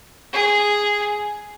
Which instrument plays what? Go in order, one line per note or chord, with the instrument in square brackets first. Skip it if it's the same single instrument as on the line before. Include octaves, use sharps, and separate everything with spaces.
[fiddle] G#4